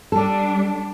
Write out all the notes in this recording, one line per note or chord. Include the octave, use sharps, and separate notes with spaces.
G3 D4 A4